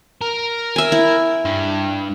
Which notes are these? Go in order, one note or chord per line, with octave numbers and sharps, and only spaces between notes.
A#4
E5 G#5
E4
G2